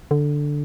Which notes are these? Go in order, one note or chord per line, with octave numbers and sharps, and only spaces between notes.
D3